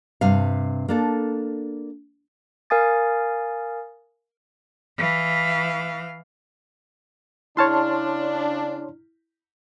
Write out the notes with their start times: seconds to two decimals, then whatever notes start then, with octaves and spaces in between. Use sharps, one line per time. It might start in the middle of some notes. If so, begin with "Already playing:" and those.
0.21 G2 C3 F5
0.88 A#3 D4 A4
2.70 A#4 F5 G#5 D#6 A6
4.98 E3 F5
7.57 C#3 D4 E4 C#5 A5 C6 F6